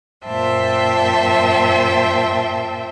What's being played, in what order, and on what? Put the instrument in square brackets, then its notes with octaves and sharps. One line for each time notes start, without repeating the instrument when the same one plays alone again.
[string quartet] F#2 A#2 C5 E5 G5 A5